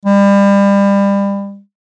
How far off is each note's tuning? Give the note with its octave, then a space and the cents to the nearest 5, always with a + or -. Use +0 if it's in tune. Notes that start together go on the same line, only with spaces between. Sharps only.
G3 +30